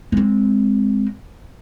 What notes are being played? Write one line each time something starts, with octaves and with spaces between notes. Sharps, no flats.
G#3 C4